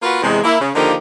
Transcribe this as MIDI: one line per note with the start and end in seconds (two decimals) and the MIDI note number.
0.02 0.22 58
0.02 0.22 65
0.02 0.22 66
0.02 0.22 71
0.23 0.39 40
0.23 0.39 48
0.23 0.39 52
0.23 0.39 56
0.44 0.57 58
0.44 0.57 64
0.60 0.69 49
0.75 0.94 50
0.75 0.94 51
0.75 0.94 53
0.75 0.94 58
0.75 0.94 63
0.75 0.94 67